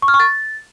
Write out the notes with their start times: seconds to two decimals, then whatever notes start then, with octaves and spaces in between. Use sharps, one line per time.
0.02 C#6
0.08 F6
0.14 C#6
0.20 A6